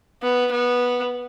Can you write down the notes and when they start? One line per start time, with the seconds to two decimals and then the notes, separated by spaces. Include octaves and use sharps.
0.23 B3
0.51 B3